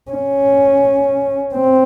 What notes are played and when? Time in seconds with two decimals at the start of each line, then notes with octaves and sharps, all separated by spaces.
0.11 C#4
1.54 C4